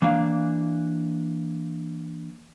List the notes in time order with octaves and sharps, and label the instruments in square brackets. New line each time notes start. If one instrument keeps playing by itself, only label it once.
[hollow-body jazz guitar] E3 A#3 D4 F5